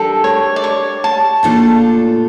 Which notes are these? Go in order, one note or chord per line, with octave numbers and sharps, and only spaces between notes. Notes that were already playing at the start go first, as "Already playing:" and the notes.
Already playing: G3 D4 G4 A4 A#4
C#5
D5
C#5
A5
A#2 A3 D4 F4 A4